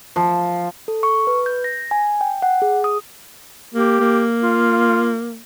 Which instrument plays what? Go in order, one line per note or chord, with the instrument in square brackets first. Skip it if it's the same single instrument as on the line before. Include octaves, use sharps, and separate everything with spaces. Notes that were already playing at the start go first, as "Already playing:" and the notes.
[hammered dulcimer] F3
[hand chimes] A4
C#6
B4
G6
A#6
G#5
G5
F#5
G#4
D#6
[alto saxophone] A#3 [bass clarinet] G4
[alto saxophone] A#3
[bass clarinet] F4